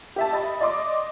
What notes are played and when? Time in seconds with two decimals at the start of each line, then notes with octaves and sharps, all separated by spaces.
0.16 G4 E5 A5
0.33 D#5 B5 A6
0.60 D5 D#5 C6 D6